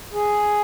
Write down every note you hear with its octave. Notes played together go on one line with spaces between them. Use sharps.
G#4